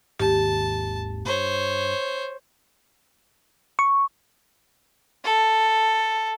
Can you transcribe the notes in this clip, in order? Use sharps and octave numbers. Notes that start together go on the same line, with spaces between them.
G#1 D#2 G#2 G4 A5
G2 C5 C#5
C#6
A4